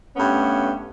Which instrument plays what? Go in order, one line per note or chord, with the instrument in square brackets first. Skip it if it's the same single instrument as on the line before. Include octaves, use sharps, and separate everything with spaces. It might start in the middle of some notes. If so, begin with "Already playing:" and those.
[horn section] G2 A3 B3 C#4